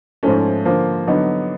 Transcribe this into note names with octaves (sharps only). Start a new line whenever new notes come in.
G#2 F3 A3 C#4
D3 F3 A#3
D3 F#3 B3 D#4